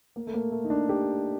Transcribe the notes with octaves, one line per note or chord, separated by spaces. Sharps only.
A#3
A3
A#3
A3
D#4
D4
G4